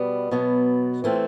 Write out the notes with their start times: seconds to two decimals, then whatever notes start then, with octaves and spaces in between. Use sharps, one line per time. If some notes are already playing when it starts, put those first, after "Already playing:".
Already playing: B2 G3 B3
0.31 B2 F#3 B3
1.04 E3 A3 C4 F4